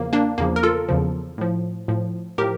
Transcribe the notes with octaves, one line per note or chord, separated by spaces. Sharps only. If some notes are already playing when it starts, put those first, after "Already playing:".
Already playing: E2 C#3 F3 A#3
A#3 D4
E2 C#3 F3 A#3
A#4
F4 A4
E2 C#3 F3
A2 F3
A2 F3
A2 F3 G4 A#4